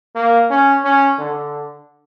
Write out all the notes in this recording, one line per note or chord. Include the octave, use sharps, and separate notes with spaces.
A#3
C#4
C#4
D3